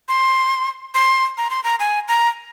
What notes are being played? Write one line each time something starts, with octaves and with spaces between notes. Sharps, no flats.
C6
C6
A#5
C6
A#5
G#5
A#5